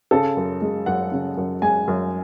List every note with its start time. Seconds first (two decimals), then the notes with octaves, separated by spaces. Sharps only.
0.11 C#3 A4
0.37 F#2
0.62 G#3
0.86 F#2 F#5
1.12 C#3
1.37 F#2
1.62 G#3 G#5
1.88 F#2